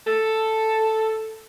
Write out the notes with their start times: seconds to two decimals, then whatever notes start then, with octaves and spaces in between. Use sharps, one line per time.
0.07 A4